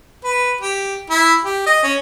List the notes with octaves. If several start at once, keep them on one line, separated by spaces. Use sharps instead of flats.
B4
G4
E4
G4
D#5
C#4